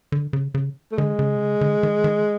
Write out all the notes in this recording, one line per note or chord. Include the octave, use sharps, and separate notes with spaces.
D3
C#3
C#3
A3
D3 G#3
C#3
C3
C#3
D3
D#3
D#3